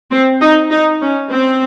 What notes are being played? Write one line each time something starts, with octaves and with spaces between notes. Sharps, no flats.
C4
D#4
D#4
C#4
C4